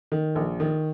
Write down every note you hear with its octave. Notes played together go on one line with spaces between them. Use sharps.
D#3
A#1
D#3